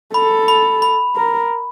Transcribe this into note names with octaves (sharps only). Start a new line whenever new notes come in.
A4 B5
B5
B5
A#4